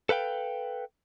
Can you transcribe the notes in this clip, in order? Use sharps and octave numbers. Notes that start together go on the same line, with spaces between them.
A4 B4 F5 G5